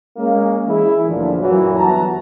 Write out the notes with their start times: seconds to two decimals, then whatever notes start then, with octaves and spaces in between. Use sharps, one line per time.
0.17 G#3 A#3 C#4
0.67 E3 C#4 E4 G#4
1.06 D2 G2 A#2 D3 E3 F3
1.39 F#2 A#2 E3 F#3
1.75 G1 E3 F#4 A5 A#5